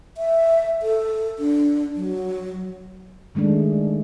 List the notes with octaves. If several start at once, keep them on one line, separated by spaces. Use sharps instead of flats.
E5
A4
D4
F#3
D#3 G#3 A3 D4